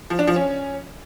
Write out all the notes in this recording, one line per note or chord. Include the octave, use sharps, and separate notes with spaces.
F3
D4
F3
C#4